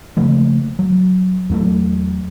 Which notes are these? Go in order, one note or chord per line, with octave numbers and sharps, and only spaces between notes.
C#3 F3 A3 A#3
F#3
E2 F#3 A3